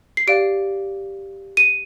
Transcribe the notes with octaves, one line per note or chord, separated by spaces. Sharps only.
C7
G4 D5 F5 D7
D#7